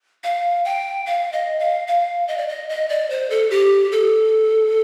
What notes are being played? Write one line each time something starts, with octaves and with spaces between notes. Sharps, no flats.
F5
G5
F5
D#5
F5
F5
D#5
D5
D#5
D#5
D5
C5
A4
G4
A4